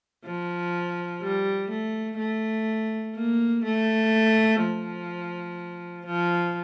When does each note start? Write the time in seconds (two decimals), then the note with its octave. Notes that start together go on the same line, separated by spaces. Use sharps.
0.25 F3
1.22 G3
1.70 A3
2.19 A3
3.15 A#3
3.64 A3
4.61 F3
6.06 F3